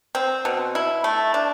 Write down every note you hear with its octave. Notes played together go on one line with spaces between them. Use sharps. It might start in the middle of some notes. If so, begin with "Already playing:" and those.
C4
B2
E4
A3
D4